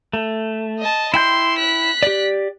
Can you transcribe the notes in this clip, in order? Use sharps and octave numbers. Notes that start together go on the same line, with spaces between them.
A3
D#5 A5
E4 G5 C6 G6
F#6 B6
G4 D5